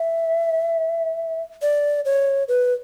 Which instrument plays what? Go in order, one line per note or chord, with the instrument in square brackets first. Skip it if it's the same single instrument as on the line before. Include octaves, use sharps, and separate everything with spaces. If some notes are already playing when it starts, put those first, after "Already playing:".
Already playing: [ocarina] E5
D5
C#5
B4